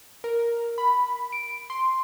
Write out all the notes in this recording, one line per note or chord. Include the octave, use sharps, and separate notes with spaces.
A#4
B5
D7
C6